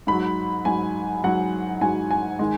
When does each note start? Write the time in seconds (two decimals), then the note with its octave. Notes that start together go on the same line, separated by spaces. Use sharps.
0.07 G#2 F#3 B5
0.65 G#2 F#3 G#5
1.24 G#2 F#3 F#5
1.81 G#2 F#3 G#5
2.11 G#5
2.39 D#3 G#3